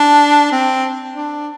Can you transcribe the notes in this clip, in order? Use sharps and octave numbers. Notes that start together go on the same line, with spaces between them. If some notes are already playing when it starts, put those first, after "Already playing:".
Already playing: D4
C4
D4